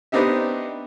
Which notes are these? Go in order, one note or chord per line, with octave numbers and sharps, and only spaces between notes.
B3 C4 D4 D#4 G4 E5